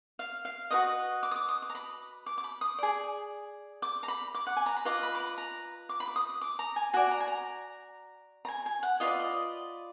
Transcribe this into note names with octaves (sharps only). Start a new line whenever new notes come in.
F5
F5
F#4 B4 D#5 D#6
D6
D#6
D6
D#6
D6
A#5
B5
D6
D6
B5
D#6
G#4 D5
D6
A#5
B5
D6
F#5
G#5
A#5
B5
F4 B4 D#5 D6
B5
D6
B5
A#5
D6
B5
D6
D#6
D6
A#5
G#5
F#4 D5 G#5
A#5
G#5
A#5
A#5
G#5
G#5
F#5
F4 B4 D5 D#5
D#5